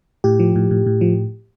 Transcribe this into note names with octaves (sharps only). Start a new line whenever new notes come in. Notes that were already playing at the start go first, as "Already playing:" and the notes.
A2 G4
F3
A2
A2
A2
F3